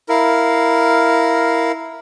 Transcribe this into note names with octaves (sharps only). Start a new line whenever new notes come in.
E4 A#4 F5